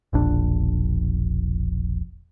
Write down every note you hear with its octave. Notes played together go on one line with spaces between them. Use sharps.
E1 A#1 D4